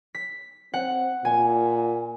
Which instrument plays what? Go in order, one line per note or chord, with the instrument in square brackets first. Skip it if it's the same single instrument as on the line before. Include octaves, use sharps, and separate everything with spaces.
[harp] B6
[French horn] C4 [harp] F#5
[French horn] A#2 [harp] G#5